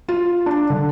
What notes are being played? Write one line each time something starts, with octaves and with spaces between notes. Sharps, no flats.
F4
D4
D3